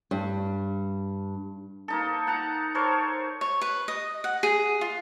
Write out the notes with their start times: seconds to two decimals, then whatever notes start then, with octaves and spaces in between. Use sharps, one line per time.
0.11 G2
1.88 A#3 D#4 A4
2.27 F#5 A5 A#5
2.75 A4 A#4 C5 C#5
3.41 C#5
3.61 B4
3.88 D#5
4.24 F#5
4.43 G#4
4.81 F4